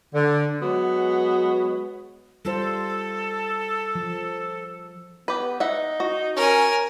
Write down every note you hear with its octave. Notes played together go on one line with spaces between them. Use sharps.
D3
F#3 G#3 B3 F#4
G3 F4 A4 C5
F3
B3 G4 B4
D#4 E5 F#5
F#4
C#4 A#4 G#5